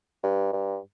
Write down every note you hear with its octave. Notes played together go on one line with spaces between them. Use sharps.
G2
G2